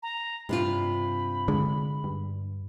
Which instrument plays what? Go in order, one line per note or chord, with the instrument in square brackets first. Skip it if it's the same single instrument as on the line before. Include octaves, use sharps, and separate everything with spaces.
[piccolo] A#5
[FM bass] G2 [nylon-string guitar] C3 D4 F4 [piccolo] B5
[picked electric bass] D3 G#3
[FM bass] G2